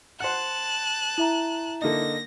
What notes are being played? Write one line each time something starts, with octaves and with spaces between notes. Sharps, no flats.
C5 F#5 A5 F#6
E4 E5 A#5
D3 A#3 D#4 A#6